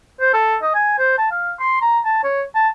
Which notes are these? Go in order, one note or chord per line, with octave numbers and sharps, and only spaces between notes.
C5
A4
D#5
G#5
C5
A5
F5
C6
A#5
A5
C#5
A5